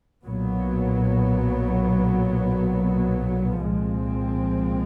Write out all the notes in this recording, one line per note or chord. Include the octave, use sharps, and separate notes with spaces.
B1 A#2 F#3 B3
C2 A#2 F3 G#3 C4